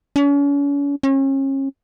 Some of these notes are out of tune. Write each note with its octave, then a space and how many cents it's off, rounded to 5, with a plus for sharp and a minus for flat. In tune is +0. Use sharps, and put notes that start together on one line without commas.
C#4 +40
C#4 -35